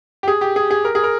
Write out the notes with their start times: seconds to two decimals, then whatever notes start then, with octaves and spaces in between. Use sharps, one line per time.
0.23 G4
0.28 G#4
0.41 G4
0.56 G#4
0.71 G#4
0.85 A#4
0.95 G#4
1.04 A#4